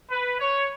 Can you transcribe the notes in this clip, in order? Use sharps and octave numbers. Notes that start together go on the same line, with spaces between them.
B4
C#5